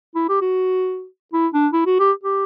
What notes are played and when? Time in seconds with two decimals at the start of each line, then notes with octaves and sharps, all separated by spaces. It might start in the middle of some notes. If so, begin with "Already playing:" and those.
0.16 E4
0.29 G4
0.41 F#4
1.34 E4
1.54 D4
1.73 E4
1.87 F#4
2.00 G4
2.24 G4